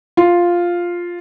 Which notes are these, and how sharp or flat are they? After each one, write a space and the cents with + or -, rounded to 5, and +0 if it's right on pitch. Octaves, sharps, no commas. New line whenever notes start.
F4 +0